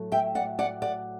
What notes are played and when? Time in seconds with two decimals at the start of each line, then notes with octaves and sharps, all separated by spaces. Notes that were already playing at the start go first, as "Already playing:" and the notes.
Already playing: A2 F#3 A3
0.12 E5 G5
0.35 D5 F#5
0.59 D5 F#5
0.82 D5 F#5